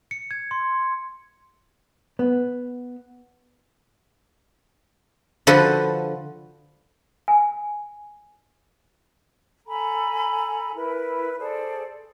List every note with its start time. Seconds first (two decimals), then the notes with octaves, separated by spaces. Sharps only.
0.11 C#7
0.31 G#6
0.51 C6
2.19 B3
5.47 D3 F3 F#4 A4 B4
7.28 G#5
9.67 A4 G#5 A#5 B5
10.75 E4 A#4 B4
11.39 G#4 A4 C5 D5